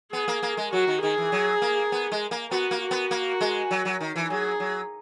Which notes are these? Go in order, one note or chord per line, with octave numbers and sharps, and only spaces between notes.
B3 G#4
A#3
A#3
G#3
F#3 F#4
D#3
D#3 G#4
E3
F#3
A#3
B3
G#3
A#3
B3 F#4
A#3
F#4
B3
A#3
G#3
F#3
F#3
D#3
E3
F#3 G#4
F#3